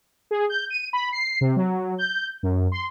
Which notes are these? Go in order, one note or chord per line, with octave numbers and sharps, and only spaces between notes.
G#4
G6
D#7
B5
C7
C3
F#3
G6
F#2
C6